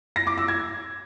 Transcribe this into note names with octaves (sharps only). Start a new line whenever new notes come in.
A#6
D6
E6
G#6